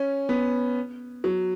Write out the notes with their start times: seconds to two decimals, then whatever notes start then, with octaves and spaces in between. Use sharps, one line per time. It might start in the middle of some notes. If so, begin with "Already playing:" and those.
Already playing: C#4
0.29 B3
1.24 F#3